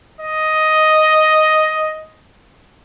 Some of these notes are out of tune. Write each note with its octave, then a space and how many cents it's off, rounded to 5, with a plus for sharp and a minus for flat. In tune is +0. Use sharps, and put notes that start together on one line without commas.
D#5 +5